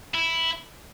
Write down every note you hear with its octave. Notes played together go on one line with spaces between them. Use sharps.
E4